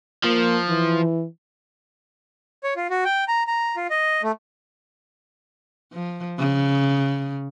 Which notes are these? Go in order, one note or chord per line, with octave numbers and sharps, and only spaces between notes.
F3 A#3
E3
C#5
F4
F#4
G5
A#5
A#5
F4
D#5
A3
F3
C#3